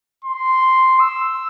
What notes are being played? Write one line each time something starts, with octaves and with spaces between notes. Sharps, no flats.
C6
E6